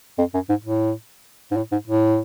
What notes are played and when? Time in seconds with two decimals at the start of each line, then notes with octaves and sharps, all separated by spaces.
0.18 F2
0.34 F#2
0.49 G#2
0.64 A2
1.51 G#2
1.56 A2
1.72 G#2
1.87 A2